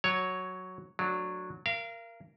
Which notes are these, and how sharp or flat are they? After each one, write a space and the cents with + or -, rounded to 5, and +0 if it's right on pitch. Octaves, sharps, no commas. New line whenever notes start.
F#3 +0 C#5 +0
F#3 -15 A3 +0 D4 +0
A#4 +0 F5 -35